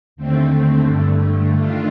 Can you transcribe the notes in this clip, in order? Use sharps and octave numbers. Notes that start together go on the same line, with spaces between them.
D#2 D3 A3 C4
G2 D3 A3
D#3 A3 D4 F4